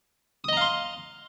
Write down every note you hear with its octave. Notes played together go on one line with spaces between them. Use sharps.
D#5 F5 A#5 C6 D#6